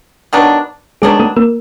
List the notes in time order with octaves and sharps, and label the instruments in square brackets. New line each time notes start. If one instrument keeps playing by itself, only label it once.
[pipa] D#3 F#3 B3 D4
[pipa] D#3 F#3 B3 D4 [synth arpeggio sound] G#3 G#4
[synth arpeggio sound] A3 A4
A#3 A#4